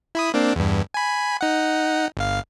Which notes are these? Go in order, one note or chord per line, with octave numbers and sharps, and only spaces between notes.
E4 B5 D#6
A#3 C4 D4
E2 G2
G#5 B5
D#4 F#5
G1 F5